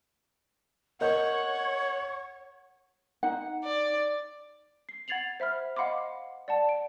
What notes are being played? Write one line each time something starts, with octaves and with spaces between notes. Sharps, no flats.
A#4 C#5 D#5 F#5 G6
D#4 F#5
D5
C7
F#5 G#6 A6 C7 F7 F#7
C5 E5 B5 F6
D#5 F5 F#5 B5 C6 D6
D5 F#5 A5
D7